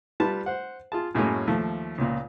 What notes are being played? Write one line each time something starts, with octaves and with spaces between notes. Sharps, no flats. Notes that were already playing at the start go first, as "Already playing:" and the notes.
G3 F4 B4 A5
C5 F#5
F4 G#4 A5
F#2 A2 G#3 A#3 C#4
D#2 F3 A3
C#2 A#2